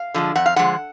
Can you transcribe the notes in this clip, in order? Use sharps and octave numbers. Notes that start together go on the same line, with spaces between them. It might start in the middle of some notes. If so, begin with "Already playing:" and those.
Already playing: F5
D3 F3 G#3
F2 F#5
F5
D3 F3 G#3 F#5